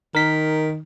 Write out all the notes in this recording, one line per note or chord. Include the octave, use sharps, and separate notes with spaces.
D#3 A#4 B6